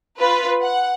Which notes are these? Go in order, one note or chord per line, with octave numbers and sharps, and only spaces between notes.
F4 B4
F#5